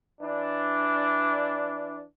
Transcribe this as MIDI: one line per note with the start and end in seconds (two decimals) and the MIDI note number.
0.21 2.03 52
0.21 2.03 62